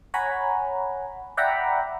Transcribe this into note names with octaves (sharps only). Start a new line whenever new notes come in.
C#5 F#5 G#5 A#5 B5
D5 E5 F#5 G5 A#5 B5